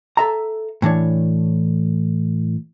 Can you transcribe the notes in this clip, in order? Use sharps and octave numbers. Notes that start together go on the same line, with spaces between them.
A4 E5 A#5
A2 E3 D4 C#5